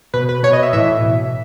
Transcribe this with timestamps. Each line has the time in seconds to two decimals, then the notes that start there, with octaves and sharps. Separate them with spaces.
0.14 B2 B4
0.29 B4
0.43 B2 C#5
0.53 D#5
0.63 E5
0.73 A2 E3 E5
1.02 B2